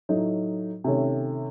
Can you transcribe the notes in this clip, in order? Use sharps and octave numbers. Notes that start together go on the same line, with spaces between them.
A2 F#3 A3 D#4
C3 D#3 A3 C#4